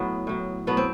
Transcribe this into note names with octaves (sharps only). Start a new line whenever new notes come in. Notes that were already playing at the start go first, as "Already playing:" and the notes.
Already playing: A2 F#3 B3
A2 F#3
A2 F#3 B3
C4